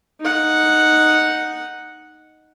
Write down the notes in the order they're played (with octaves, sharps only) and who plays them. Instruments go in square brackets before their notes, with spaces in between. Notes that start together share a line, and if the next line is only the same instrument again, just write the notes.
[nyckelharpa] D#4 F#5